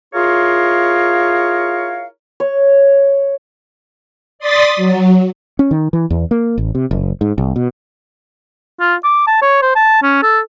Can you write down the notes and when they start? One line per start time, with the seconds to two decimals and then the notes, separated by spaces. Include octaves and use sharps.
0.13 E4 F4 G#4 A#4 C#5 F5
2.40 C#5
4.39 D5 C6 D#6 A6 B6
4.76 F#3
5.59 C#4
5.71 D#3
5.93 E3
6.10 E2
6.31 A#3
6.58 A1
6.75 C3
6.91 F#1
7.21 G#2
7.38 C2
7.56 B2
8.80 F4
9.04 D6
9.27 A5
9.42 C#5
9.62 C5
9.76 A5
10.03 C#4
10.22 A4